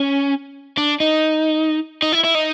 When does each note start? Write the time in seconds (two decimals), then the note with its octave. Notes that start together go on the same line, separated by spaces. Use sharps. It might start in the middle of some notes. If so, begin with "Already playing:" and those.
Already playing: C#4
0.78 D4
1.00 D#4
2.02 D#4
2.12 E4
2.24 E4
2.35 D#4